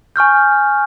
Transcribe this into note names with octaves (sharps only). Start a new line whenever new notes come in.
G#5 C#6 F6 G6